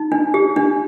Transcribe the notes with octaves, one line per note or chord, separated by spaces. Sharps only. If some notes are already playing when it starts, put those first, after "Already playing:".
Already playing: D#4
D4
G4
D4